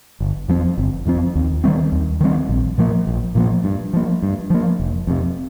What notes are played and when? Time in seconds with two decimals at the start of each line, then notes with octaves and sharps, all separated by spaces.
0.20 G1
0.48 F2 F3 C4
0.78 G1
1.06 F2 F3 C4
1.35 D#2
1.64 D#3 G3 C4
1.92 D#2
2.21 D#3 G3 C4
2.49 A#1
2.78 A#2 F3 A#3
3.07 A#1
3.35 A#2 F3 A#3
3.64 G2
3.93 F3 A#3
4.22 G2
4.50 F3 A#3
4.79 F1
5.07 F2 C3